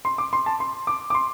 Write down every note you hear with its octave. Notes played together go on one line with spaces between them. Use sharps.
C6
D6
C6
A5
C6
D6
D6
C6